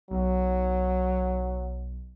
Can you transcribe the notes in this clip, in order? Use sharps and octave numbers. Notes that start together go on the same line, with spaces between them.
B1 F#3